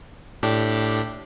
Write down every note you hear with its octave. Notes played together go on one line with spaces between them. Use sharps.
A2 D4 G4